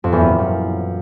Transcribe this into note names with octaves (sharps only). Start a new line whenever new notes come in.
F2
E2
F#2
A#2
F#2